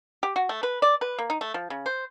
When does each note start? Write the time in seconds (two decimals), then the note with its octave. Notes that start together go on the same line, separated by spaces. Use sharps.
0.23 G4
0.36 F#4
0.49 A3
0.63 B4
0.82 D5
1.01 B4
1.19 A#3
1.30 D#4
1.41 A3
1.54 F3
1.70 C#3
1.86 C5